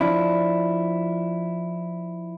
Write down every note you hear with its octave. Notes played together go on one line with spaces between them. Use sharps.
F3 D4 E4